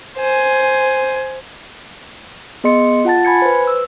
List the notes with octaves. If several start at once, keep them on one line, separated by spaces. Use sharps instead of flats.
C5 G#5
B3 G#4 D#5 C6 C#7
F4 F#5 A5 A6
G#5 B5 G#6 C#7
B4 C5
E6